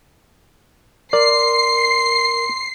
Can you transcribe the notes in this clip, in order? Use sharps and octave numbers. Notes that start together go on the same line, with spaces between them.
A#4 D5 C6 C7